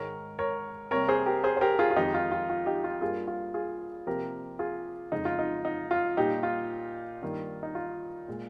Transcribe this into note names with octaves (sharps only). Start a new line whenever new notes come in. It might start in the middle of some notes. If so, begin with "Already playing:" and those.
Already playing: G#2 D#3 G#3 A#4 C#5
A#4 C#5
C3 G3 A#3 A#4 C#5
G#4 C5
G4 A#4
G#4 C5
C5
G4 A#4
F4 G#4
F4
F2 D#3 G#3 D#4 G4
F4
F4
F4
D#4 G4
F4
G2 G3 A#3 F4 G#4
F4
F4 G#4
C3 F3 A#3 G4 A#4
F4 G#4
F2 C#3 G#3 D#4
F4
D#4
D#4
F4
A#2 G3 A#3 D#4 G4
F4
G2 D#3 A#3
D#4
F4
A#2 G#3